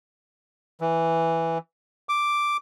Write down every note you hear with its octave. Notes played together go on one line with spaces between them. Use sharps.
E3
D6